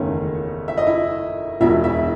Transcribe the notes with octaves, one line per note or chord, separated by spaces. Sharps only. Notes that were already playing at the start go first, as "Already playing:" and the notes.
Already playing: F#1 E2 D#3 A3 C#4
E5
D#5
E4 E5
E1 E2 B2 E4 E5
E4 E5